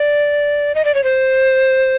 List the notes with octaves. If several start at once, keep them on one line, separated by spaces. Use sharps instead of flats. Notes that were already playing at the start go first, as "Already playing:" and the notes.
Already playing: D5
D#5
D5
C#5
C5